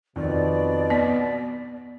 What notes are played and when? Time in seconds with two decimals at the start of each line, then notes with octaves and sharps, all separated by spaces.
0.16 F2 B2 D#3 D5
0.90 B3 B6